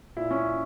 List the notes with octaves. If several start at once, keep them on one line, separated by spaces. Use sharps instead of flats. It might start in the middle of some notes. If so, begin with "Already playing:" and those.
A#2 E4
C#4